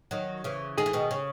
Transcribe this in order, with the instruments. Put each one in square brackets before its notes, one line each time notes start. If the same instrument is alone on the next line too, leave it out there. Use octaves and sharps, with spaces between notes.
[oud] D#3 F#3
C#3 E3
[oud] D#3 [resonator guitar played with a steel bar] G#4
[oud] E3
B2 D#3
C#3